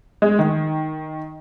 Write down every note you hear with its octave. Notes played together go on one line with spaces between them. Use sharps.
G#3
D#3